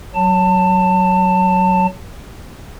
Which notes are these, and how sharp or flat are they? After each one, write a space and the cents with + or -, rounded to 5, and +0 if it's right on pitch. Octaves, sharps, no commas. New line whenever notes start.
F#3 +10 A5 +25